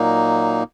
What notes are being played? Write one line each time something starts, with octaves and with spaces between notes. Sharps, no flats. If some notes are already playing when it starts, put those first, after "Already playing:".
Already playing: A#2 F#3 A#3 D#4